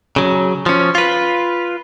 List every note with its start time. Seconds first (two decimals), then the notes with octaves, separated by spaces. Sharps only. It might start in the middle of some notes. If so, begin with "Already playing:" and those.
0.16 C#3 F#3
0.66 F3 C#4
0.95 F4 B4